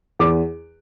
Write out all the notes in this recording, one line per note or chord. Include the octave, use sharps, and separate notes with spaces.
E2 D6